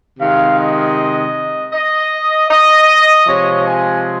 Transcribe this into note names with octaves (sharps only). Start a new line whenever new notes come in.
C3 D#3 G#3 F5
D#5
D#5
D#5
C3 F3 G#3 C#5
G#5